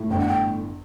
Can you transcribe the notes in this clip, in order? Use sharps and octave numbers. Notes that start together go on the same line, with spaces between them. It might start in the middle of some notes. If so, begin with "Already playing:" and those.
Already playing: A2
G1 G5
F#5
G5